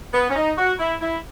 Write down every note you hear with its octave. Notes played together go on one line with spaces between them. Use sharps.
B3
C#4
D#4
F#4
E4
E4